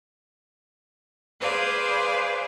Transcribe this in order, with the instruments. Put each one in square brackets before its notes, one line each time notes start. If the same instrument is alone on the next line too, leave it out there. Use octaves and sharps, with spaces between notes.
[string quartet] G#4 B4 C5 D5 F5